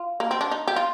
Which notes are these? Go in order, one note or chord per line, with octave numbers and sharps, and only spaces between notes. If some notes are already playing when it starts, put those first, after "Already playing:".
Already playing: F4
A#3
C4
D4
D#4
G4
F4